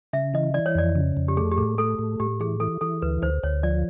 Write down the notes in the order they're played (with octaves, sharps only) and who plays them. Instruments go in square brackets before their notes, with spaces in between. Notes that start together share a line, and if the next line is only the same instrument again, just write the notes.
[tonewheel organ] C#3 [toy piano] E5
[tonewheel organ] E3 [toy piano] D#5
[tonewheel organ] E3 [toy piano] D5
[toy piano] C#5
[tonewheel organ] F2 [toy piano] D5
[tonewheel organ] C#3
F2
[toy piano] G4
[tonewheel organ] A3 [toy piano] G#4
[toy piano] G4
[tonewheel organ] A2 [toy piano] G#4
[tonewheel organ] A3 [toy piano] A4
[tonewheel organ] A2
[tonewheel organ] A2 [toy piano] G4
[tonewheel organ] E3 [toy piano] G#4
[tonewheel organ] E3 [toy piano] A4
[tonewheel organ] E3 [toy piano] A4
[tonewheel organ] D2 [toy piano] B4
[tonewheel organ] D2 [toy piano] C5
[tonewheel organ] D2 [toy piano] C#5
[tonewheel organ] F3 [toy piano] D5